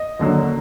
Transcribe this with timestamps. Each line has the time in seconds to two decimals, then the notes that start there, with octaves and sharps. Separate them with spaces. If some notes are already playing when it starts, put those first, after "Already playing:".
Already playing: D#5
0.19 D#2 D3 F#3